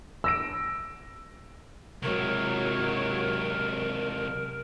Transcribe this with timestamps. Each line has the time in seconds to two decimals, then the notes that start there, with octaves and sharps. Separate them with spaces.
0.24 E6 A#6 D7
2.03 C3 F#3 G#3 A#4 C#5